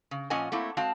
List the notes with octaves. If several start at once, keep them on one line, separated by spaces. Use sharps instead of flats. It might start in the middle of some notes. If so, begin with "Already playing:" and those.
C#3
A#2 F3 C#4 D#5 F#5 G#5
A3 A#3 C4 E4
G#3 C4 F#4 F5 A5